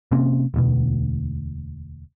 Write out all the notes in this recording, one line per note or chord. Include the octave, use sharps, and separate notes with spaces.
C3 A#3 C4 C#4
E1 D2 B2